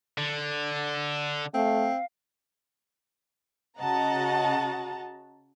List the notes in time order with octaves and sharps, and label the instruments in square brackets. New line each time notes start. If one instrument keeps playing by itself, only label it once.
[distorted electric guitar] D3
[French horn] A3 [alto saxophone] C4 [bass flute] F5
[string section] C#3 F#4 D#5 F#5 A5 A#5